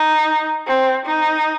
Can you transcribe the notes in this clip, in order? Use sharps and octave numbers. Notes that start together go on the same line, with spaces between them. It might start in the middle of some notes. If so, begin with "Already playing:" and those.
Already playing: D#4
C4
D#4